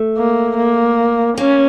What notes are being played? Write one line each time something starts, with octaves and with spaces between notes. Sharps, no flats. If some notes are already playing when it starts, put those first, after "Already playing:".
Already playing: A3
A#3
A#3
A#3 C#4